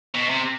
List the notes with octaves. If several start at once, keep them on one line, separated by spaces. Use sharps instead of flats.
B2
C3